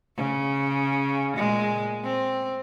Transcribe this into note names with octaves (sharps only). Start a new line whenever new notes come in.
C#3
A#2 G#3
C4